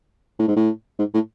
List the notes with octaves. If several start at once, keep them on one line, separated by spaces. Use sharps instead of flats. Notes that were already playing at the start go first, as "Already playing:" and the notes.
A2
G#2
A2
G#2
A2